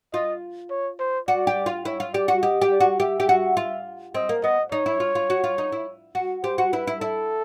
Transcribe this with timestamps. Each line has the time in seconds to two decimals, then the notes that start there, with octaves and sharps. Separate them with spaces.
0.14 F4 D#5
0.70 C#5
0.99 C5
1.28 F#4 D5
1.47 G4
1.66 F4
1.85 E4 C#5
2.00 F4
2.14 G4 D5
2.28 F#4
2.43 G4 D#5
2.61 G4
2.71 D5
2.80 F#4
3.00 G4 E5
3.20 G4
3.29 F#4
3.57 F4
4.14 C4 D#5
4.29 A#3
4.43 B3 D#5
4.72 D#4 C#5
4.86 E4
5.00 F4
5.15 F4
5.30 F#4
5.44 F4
5.58 D#4
5.72 E4
6.15 F#4
6.44 G4 C5
6.58 F#4
6.72 E4 B4
6.87 E4
7.01 E4 A4